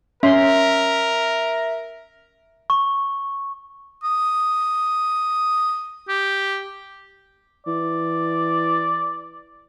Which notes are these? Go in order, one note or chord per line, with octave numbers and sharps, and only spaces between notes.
C#4 A#4 E5 C6
C#6
D#6
G4
E3 D5